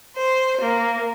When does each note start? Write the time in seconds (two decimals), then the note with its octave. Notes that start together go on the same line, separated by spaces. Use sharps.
0.17 C5
0.62 A#3